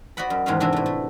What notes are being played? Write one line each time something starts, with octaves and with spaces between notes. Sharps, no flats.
F#4 D5 D#5 F#5 B5
F#2
E2 G#2 D#3 A3 C#4 F5
C3 E3 D4 F#4
A2 A3
A3